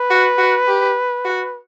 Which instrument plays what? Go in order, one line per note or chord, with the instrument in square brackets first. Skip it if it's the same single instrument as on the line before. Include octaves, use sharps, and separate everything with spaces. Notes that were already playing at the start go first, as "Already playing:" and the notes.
Already playing: [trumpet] B4
[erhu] F#4
F#4
G4
F#4